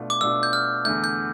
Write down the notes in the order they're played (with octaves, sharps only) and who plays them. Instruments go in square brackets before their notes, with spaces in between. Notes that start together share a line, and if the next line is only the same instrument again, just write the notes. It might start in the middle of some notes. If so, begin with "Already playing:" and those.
Already playing: [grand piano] B2 A3 D4 F4
[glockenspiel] D6
[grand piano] B2 A3 D4 F4 [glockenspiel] E6
[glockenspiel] G6
F6
[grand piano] E2 D3 A3 [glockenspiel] G6
[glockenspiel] G6